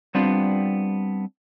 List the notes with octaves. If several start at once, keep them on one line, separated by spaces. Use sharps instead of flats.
G3 B3 C4 D4 F4